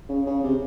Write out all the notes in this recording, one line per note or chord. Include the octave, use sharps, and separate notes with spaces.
C#3
C#3
C3